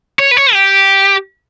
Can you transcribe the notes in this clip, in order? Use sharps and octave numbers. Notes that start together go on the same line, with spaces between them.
C#5
B4
C#5
G4